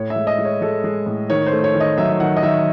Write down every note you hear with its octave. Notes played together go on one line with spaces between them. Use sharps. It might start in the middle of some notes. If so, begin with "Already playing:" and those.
Already playing: A2 C#5
E5
G#3
D#5
G#3
C#5
G#3 A4
G#3
A2
D#3 C#5
C5
A3
C#5
D#3
D#5
F#3 E5
E5
D#3 F#5
D#5
D#3 E5